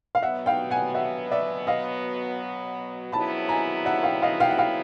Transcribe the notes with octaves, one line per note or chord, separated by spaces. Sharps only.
F5
B2 F#3 B3 E5 F#5
F5 G5
F#5 G#5
E5 F#5
D5 E5
D#5 F5
F2 C#3 F#3 B3 E4 A5 B5
G#5 A#5
E5 F#5
F5 G5
D#5 F5
F5 G5
F#5
F5 G5